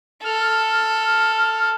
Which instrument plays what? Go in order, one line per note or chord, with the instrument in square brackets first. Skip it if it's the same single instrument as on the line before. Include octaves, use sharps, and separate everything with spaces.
[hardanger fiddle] A4 [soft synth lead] F6